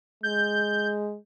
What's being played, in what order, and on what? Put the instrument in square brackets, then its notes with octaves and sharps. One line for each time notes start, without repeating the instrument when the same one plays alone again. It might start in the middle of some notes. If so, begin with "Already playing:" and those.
[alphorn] G#3 [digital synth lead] G6